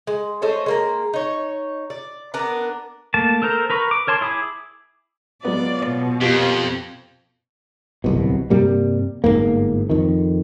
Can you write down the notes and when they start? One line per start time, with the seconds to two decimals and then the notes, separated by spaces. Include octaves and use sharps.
0.07 G#3
0.42 A3 C5 C#5 D#5
0.66 G#3 A#3 A#4
1.14 D#4 C#5
1.90 D5
2.34 B3 D4 A#4
3.14 A3 A#3 A5
3.42 A4 A#4 C5 A#5
3.70 A#4 B4 A#5 C#6
3.91 D6
4.07 A#4 C#5 A5 C6
4.21 E4 G#4 B5 D6
5.45 F#3 G#3 B3 F4 D5
5.87 B2
6.21 F2 A#3 C4 F4 G4
8.04 D1 C2 B2
8.50 G2 C3 G3 A#3
9.24 G1 E2 G#2 A#3
9.90 F2 D#3